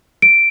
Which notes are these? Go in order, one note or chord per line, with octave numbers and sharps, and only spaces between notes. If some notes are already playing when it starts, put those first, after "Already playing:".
D7